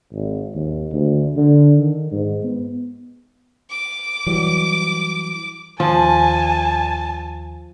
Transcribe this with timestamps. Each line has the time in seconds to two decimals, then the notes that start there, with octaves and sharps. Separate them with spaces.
0.12 G#1
0.55 D#2
0.92 D2
1.36 D3
1.77 D#3
2.11 G#2
2.44 B3
3.71 D6
4.26 E3 F#3 G3
5.80 D#2 F3 G#5 A5